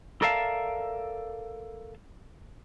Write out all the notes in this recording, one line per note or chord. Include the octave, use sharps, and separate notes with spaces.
A4 A#4 D5 E5 F5 A5